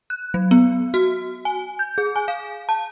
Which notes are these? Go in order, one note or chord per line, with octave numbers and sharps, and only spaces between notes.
F#6
F#3
B3
F#4
G#5
G6
G#4
G#5
F5
A5